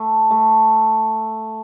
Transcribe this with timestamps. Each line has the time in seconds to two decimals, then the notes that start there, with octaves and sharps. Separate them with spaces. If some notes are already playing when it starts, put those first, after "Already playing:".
Already playing: A3
0.31 A3